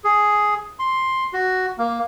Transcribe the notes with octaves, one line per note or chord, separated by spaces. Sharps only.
G#4
C6
F#4
A#3